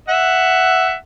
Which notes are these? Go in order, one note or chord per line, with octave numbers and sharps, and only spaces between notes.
E5 F#5